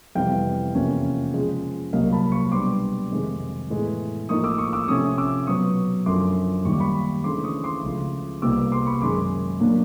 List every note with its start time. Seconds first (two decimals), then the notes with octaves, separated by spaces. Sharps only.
0.15 F2 C3 E3 G3 B3 F5 G5
0.75 E2 C3 F3 A#3 C#4
1.33 C#3 F3 G#3
1.93 C2 A#2 F#3 A#3 D#5 F5
2.12 A5 B5
2.32 B5 C#6
2.52 B2 G3 B3 D4 C6 D6
3.11 F2 C3 D#3 G#3 C4
3.70 A2 E3 G#3 B3
4.29 A2 F3 A#3 D#4 C#6 D#6
4.44 D6 E6
4.58 C#6 D#6
4.73 D6 E6
4.88 C3 F3 A3 C#4 C#6 D#6
5.18 D6 E6
5.47 B2 F#3 B3 C#6 D#6
6.06 F#2 D3 F3 C6 D6
6.65 D#2 D#3 G3 C#6
6.73 D6
6.80 B5 C#6
7.24 C#3 E3 A3 D4 C6 D6
7.44 C#6 D#6
7.64 C6 D6
7.83 C#2 C#3 F3 A3
8.42 C2 A#2 G3 B3 D#4 D6 E6
8.72 C6 D6
8.87 B5 C#6
9.02 F#2 D#3 G#3 C6 D6
9.60 A#2 F#3 A#3 D4